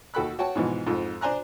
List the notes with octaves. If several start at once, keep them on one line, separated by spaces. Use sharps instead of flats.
D#2 F#4 A4 G5 B5 F#6
F#4 C#5 G5 A5
G#2 B2 E3 F3
F2 G#2 F3
D4 C5 G#5 A#5 F#6